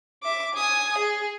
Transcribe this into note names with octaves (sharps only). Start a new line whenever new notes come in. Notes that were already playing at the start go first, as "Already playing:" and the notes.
E5 D6
G#5 D#6
G#4